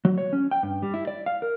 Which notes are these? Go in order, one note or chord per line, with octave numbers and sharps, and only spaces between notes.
F#3
C#5
C#4
G5
G2
G3
E4
D5
F5
A#4